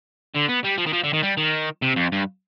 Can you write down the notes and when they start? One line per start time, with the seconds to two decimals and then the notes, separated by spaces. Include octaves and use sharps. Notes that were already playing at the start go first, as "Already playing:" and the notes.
0.35 D3
0.48 B3
0.64 G3
0.78 F3
0.87 D#3
0.93 F3
1.04 D3
1.13 D#3
1.23 G3
1.37 D#3
1.82 C3
1.96 F2
2.12 G2